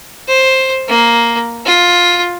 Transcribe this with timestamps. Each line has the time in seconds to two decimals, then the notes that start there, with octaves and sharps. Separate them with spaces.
0.28 C5
0.88 A#3
1.66 F4